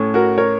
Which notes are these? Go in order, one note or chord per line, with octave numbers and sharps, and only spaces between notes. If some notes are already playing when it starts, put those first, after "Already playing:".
Already playing: A2 A3 C#4
F#4 A#4
A#4 C#5